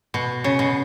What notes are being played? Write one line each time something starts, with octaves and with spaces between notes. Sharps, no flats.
B2
C#3
B2